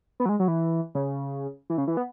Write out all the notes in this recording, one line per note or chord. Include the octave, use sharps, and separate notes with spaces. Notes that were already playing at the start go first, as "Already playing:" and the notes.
B3
F#3
G#3
F#3
E3
C#3
E3
C#3
E3
B3